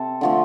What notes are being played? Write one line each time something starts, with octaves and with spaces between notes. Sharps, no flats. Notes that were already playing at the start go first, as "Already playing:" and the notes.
Already playing: C3 A4
D3 F3 A3